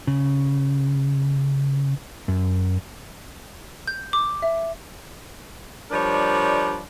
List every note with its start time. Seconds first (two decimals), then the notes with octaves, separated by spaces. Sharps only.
0.07 C#3
2.28 F#2
3.87 G6
4.13 D6
4.42 E5
5.91 F3 G3 D4 A#4 C#5 D5